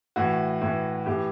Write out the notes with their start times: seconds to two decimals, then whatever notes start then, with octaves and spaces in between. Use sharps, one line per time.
0.16 A2 E3 F#4
0.62 A2 E3
1.06 A2 E3 G4